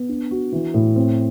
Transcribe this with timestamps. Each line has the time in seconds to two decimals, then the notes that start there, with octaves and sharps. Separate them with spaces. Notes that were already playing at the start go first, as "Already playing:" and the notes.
Already playing: B3
0.09 D4
0.31 F#4
0.52 E3
0.74 A2
0.96 C4